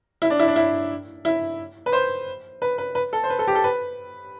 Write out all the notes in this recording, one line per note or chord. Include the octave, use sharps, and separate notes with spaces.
E4
D4
E4
D4
E4
E4
B4
C5
B4
B4
B4
A4
C5
B4
A4
G4
A4
B4